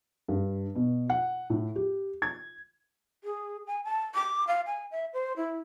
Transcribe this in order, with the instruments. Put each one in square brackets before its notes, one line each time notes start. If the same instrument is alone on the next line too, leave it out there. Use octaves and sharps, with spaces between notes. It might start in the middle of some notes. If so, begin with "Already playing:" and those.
[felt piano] G2
B2
F#5
A2
G4
G#6
[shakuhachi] G#4
G#5
A5
D6
F5
G#5
E5
C5
E4